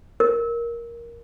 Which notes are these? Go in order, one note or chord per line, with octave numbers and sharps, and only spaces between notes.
A#4